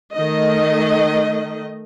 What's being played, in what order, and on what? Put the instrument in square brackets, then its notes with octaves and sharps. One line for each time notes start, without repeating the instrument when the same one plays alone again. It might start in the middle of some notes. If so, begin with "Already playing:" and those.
[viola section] D#3 A3 D#5